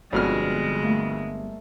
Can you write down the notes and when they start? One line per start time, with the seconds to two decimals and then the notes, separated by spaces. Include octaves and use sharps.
0.13 G1 F2 B2 G#3 D5 F6
0.82 G3 A3 A#3